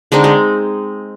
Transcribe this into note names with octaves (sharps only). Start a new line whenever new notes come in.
D3 G#3 C4 D#4
G#3